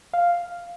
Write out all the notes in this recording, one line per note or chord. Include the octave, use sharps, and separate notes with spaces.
F5